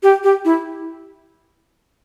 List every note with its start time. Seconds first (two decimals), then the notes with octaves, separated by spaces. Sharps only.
0.03 G4
0.24 G4
0.45 E4